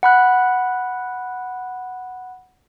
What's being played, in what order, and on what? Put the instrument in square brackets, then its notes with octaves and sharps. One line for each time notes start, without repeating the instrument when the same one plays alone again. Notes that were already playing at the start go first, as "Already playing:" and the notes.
[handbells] F#5 B5 F#6